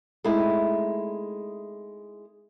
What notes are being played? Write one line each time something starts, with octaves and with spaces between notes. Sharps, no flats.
G#3 A3 C4 D#4 E4